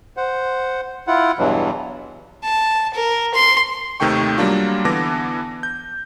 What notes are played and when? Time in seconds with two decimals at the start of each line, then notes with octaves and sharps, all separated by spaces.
0.17 C5 F#5
1.07 E4 F4 F#5
1.38 E2 G2 B2 E3 F#3
2.44 A5
2.94 A#4
3.34 C6
4.00 D#2 C3 D#3 A3 G5 C#6
4.38 F#3 G3 A#3 D4 F4
4.85 D3 E3 B3 A5 D6 A#6
5.63 G6